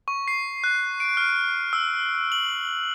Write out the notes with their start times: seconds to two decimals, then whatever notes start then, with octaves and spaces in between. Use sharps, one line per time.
0.08 C#6
0.28 C7
0.64 F#6
1.00 D7
1.17 F6
1.73 E6
2.32 F#7